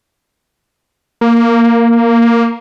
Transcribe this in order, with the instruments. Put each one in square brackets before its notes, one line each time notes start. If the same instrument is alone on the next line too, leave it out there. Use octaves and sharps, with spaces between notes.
[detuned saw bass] A#3